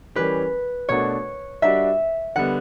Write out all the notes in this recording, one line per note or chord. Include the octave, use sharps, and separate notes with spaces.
E3 G3 C#4 G4 B4
B2 A3 D4 F#4 C#5
G3 D4 F#4 E5
D3 G3 B3 F#5